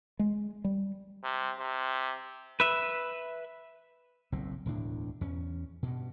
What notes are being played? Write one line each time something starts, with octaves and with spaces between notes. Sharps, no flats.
G#3
G3
C3
C3
B4 E5
F#1 B1 A2 C4
E1 D2 A2 D4
E2 C#4
G2 B2